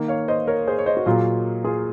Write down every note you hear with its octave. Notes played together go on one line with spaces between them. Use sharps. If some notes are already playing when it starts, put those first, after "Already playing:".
Already playing: D#3 A#3
C#5 F5
C5 D#5
A#4 C#5
G#4 C5
C#5
C5 D#5
F#4
A#2 F#3 A#3 F4 G#4
F4 G#4